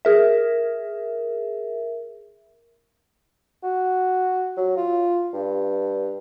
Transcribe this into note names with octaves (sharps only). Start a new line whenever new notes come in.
G#4 A#4 E5
F#4
F#3
F4
G2